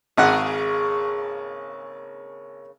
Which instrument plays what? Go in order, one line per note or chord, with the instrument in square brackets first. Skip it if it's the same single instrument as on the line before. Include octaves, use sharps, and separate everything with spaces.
[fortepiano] G#1 F#5 [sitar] C#3 A#3 G#4